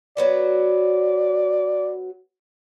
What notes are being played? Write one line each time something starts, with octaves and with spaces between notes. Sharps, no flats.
F#3 B3 F#4 D5